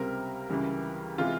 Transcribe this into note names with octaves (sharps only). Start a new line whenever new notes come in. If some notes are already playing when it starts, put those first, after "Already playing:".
Already playing: C#2 C3 G3 C4 A#4
C#2 C#3 E3 G3
C3 E3 G#3 F4